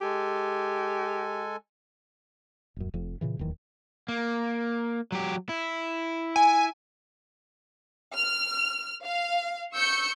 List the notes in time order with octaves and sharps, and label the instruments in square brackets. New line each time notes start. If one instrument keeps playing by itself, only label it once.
[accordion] G#3 A4 G#5 [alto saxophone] G4
[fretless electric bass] D#1 F#2
F1 F2
A#2 C#3 E3
D1 D#2 D#3 E3
[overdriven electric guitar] A#3
F#3 G4
E4
[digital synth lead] G#5
[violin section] F6
F5
C#6 E6 G6 C#7